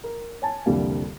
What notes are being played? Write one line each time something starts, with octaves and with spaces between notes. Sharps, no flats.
A#4
C#5 G#5 A5
C2 F2 D3 G3 A#3